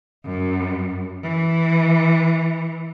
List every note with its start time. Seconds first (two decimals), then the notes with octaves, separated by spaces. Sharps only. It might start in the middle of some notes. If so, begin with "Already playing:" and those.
0.25 F#2
1.23 E3